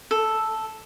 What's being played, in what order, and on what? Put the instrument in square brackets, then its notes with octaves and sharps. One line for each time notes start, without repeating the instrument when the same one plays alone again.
[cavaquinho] A4